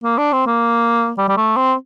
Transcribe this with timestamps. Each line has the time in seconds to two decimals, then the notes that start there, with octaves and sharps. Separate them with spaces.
0.04 A#3
0.18 D4
0.32 C4
0.46 A#3
1.18 G3
1.28 G3
1.37 A3
1.56 C4